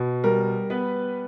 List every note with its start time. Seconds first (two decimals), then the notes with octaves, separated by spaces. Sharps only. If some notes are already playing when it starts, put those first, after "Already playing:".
Already playing: B2
0.24 G3 A#4
0.70 B3 B4